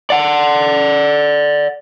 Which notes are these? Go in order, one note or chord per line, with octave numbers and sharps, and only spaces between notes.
D5 F#5